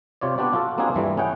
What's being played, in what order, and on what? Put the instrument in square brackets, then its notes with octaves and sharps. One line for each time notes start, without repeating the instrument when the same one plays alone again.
[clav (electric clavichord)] C3 F4 C#5 D5
B3 D4 G4 D5
F4 F#4 A4
A#3 C4 D4 D#4 F4 G#4
G2 E3 G3 A3
C#4 E4 G#4 F#5 G5